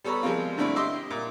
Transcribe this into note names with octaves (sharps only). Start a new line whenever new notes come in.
G3 B3 A4 C#5 A#5 B5
F3 G3 G#3 A#3 C4 F4
G2 D3 A3 C4 D4 E4
G4 D#5 E5 C6 D6 E6
A#2